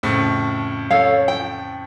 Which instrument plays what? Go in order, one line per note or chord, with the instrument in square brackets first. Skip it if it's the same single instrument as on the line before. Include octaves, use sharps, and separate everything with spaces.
[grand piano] F2 A2 C#3
[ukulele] A4 C#5 F5
G5